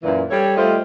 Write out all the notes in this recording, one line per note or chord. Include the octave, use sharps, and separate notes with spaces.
F#2 A#2 E3
G3 A4 C#5
G3 A3 F4 C5 D#5